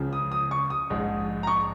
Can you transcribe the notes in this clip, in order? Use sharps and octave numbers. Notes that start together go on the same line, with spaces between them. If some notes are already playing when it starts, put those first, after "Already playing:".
Already playing: C#2 C#3 F3
D#6
D#6
C#6
D#6
A#1 G#2 G#3
A#5
C#6